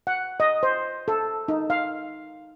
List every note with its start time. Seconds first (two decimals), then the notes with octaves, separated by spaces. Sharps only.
0.07 F#5
0.40 D#5
0.63 C5
1.08 A4
1.48 D#4
1.70 F5